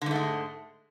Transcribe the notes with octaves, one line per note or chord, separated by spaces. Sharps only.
G#2 D3 G#3 A3